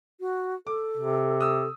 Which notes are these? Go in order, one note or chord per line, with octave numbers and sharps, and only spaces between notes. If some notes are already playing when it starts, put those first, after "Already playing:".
F#4
A4 D6
C3
D#6 E6